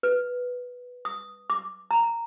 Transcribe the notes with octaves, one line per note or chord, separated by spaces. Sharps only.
B4
D#6
D6
A#5